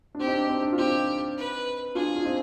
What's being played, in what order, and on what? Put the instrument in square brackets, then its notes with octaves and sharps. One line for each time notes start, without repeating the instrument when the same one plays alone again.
[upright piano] D4
[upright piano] C4 [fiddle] G4
[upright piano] D#4
D4
C4
D4
F4
[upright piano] C4 D#4 [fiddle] G4
[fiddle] B4
[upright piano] D4 F4 [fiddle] G#4
[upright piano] F4
C4 D#4